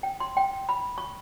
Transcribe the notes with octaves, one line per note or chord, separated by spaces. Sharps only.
G5
C6
G5
B5
C#6